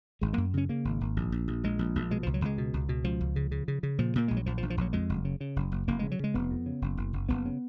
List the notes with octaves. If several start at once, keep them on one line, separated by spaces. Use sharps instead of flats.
G#1 G#3
F#2 A#3
C#3 C#4
C#3 A#3
G#1
G#1
A#1
A#1
A#1
A#1 G#3
A#1
A#1
B2 G#3
C#2 F3
F#3
C#2 G#3
B2
C#2
B2
C#2 F3
C#2
C#3
C#3
C#3
C#3
A#2 F3
A#2 A#3
A#1 G#3
F#3
A#1 F3
F3
A#1
F3
A#1 F#3
F2 G#3
F#1
C#3
C#3
F#1
F#1
F1 A#3
C#3 G#3
F#3
C#3 G#3
F1 B3
F2
C#3
F#1
F#1
F#1
F#1 B3
C#3